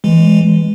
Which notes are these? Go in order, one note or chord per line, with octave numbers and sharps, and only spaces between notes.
E3 G#3